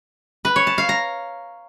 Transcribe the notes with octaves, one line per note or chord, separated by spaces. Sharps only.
B4
C#5
A5
F5
A#5